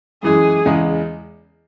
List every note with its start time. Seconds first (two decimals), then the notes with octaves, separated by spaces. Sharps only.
0.23 F#2 E3 G#3 G#4
0.65 E2 C#3 G#3